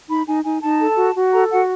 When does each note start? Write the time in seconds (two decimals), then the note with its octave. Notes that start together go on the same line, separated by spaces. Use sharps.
0.09 D#4 B5
0.26 D#4 G#5
0.44 D#4 G#5
0.62 D#4 A5
0.80 A4
0.97 F#4
1.15 F#4
1.32 A4 A#5
1.50 F#4 F#5